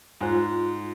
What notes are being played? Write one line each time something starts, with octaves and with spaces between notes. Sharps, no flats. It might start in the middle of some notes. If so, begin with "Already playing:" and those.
G#2 F4 C5 G#5